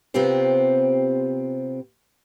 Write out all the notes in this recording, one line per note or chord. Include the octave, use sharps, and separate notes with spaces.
C3 B3 C4 F4 G4 C5